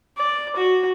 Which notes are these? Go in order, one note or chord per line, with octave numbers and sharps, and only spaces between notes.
D5
F#4